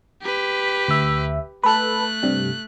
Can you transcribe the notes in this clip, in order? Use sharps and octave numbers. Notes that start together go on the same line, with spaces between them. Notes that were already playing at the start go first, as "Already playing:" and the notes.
G4 B4
D2 E5
A3 A4 B4 F#6
G2 C3 G3